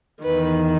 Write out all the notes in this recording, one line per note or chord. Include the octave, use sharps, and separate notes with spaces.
E2 D#3 B4